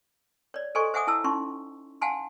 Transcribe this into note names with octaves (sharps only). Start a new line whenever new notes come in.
C#5 D5
A4 C5 D#5 G#5 C6 C#6
C5 E5 F#5 G#5 D6 D#6
E4 A5 E6
C#4 D#4 E4 C6 C#6
F5 F#5 G#5 A5 C6